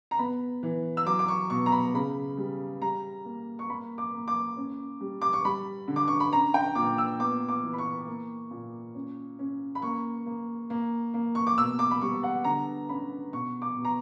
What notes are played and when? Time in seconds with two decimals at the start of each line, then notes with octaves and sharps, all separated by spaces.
0.11 A#5
0.19 B3 B5
0.63 E3
0.97 E6
1.06 F#3 D6
1.19 D6
1.28 C#6
1.50 B2 C#6
1.66 A#5
1.72 B5
1.94 C#3 B5
2.38 G3
2.81 G3 A#5
3.25 A#3
3.59 C#6
3.70 A#3 B5
3.98 D6
4.14 A#3
4.28 D6
4.57 C#4
5.01 G3
5.22 D6
5.33 C#6
5.44 G3 B5
5.88 D3
5.96 D6
6.08 C#6
6.20 B5
6.32 C#4 A#5
6.54 G5
6.75 A#2 D6
6.98 E6
7.20 B3 D6
7.48 D6
7.63 E3
7.73 B5
7.78 C#6
8.07 A#3
8.51 A#2
8.95 C#4
9.39 C#4
9.75 B5
9.82 A#3 C#6
10.26 A#3
10.70 A#3
11.14 A#3
11.35 C#6
11.47 D6
11.58 B2 E6
11.79 D6
11.91 B5
12.01 G3 C#6
12.23 F#5
12.44 D3 A#5
12.89 C#4 B5
13.33 B2 C#6
13.62 D6
13.76 B2
13.85 A#5